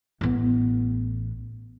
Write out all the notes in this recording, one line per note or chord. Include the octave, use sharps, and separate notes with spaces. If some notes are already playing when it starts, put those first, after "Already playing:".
A1 B3